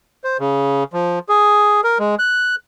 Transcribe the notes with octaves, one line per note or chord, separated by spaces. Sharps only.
C5
C#3
F3
G#4
A#4
G#3
F#6